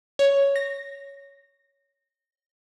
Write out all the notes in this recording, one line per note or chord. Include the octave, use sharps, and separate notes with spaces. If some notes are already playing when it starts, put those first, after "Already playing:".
C#5
A#6